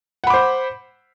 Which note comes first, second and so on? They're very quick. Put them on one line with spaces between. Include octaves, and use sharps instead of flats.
F#5 B5 D6 C5